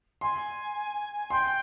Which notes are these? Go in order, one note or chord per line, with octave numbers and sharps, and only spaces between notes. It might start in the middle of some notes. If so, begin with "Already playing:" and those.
G#5 C6
G5 C6